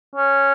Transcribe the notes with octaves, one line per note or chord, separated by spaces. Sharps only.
C#4